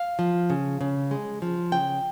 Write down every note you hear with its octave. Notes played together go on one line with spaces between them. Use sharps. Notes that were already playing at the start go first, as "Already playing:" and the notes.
Already playing: F5
F3
C#3
C#3
G#3
F3
C#3 G5